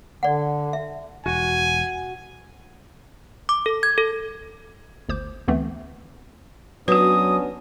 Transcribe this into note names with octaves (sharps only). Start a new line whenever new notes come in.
D3 D5 F#5
E5
E1 F#4 G#5
D6
A4
G#6
A4
G1 D2 C5 D6 G6
D2 D3 E3 A3 B3 C4
F#3 B3 C#4 D4 F#4 B4 D#6